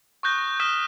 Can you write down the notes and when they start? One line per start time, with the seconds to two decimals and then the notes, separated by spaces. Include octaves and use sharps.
0.23 C#6 D#6 F#6 G6 A#6
0.38 A#6
0.60 D#6 F6 G6 B6 E7 G7